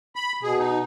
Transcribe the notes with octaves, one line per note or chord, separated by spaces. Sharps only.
B5
B2 G#4
D#4